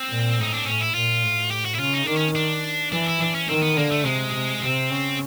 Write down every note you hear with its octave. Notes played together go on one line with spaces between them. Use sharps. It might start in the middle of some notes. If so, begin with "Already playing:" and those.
Already playing: C4
A#2
A2 D#4
D4
A2 C#4
E4
A#2 F4
A2
G4
F#4
E4
C#3 F4
D#4
D#3 D4
C#4
D4
E3 D4
E4
D4
C#4
D#3 C4
B3
D3 A#3
A3
C3 G#3
C3
C3 C4
C#3